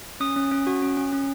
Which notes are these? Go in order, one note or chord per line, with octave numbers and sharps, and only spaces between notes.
C#4 D#6
C#4
C#4
F#4
C#4
C#4
C#4